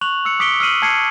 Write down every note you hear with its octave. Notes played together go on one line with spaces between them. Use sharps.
C#6 F#6 F7 F#7
E6 C#7 F#7
D6 D#6 B6 C#7 D7 G7
E6 F6 C7 D#7 F#7
A5 G#6 C7 C#7 D#7